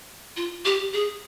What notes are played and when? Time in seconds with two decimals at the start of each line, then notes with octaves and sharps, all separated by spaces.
0.37 F4
0.65 G4
0.93 G#4